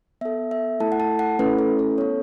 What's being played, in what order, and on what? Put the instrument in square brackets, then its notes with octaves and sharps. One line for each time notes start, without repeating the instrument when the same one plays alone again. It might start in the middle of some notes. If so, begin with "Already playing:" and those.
[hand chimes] B3 A4 E5
E5
A3 E4 A4 A5
F#5
A5
F#5
A3 C#4 E4 A4 B4
A4
A4
B3 A4 C#5